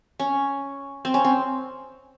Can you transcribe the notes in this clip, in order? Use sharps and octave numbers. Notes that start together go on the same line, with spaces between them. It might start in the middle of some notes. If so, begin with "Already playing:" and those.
C#4
C4
C#4
C4